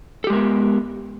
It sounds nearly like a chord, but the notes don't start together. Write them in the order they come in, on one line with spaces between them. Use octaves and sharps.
A4 G4 G#3 A#4 B3